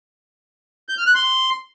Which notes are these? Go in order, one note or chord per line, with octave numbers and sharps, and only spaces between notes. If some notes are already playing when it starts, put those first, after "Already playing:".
G6
F6
F#6
C6